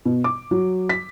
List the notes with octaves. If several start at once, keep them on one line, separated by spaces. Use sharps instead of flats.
B2
D6
F#3
B6